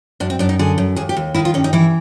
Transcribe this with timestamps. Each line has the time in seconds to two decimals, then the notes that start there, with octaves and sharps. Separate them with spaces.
0.20 F#2 D4
0.30 C4
0.39 F#2 D4
0.49 D#4
0.59 D3 G#4
0.78 F#2
0.96 D#2 G#4
1.09 G4
1.17 D#2
1.35 D#3 E4
1.45 F4
1.54 G2 C#4
1.64 D#4
1.73 E3 E4